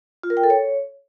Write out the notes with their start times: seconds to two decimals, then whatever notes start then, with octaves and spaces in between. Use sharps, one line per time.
0.23 F4
0.30 A#4
0.37 G5
0.43 A4
0.50 C#5